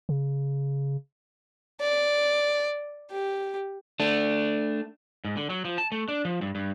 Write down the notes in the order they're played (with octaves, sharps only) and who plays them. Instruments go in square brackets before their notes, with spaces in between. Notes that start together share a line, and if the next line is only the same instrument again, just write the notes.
[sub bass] C#3
[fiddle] D5
G4
[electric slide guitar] A3 D4
[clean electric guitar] G#2
D3
F#3
F3
A5
A3
D4
F3
G2
G2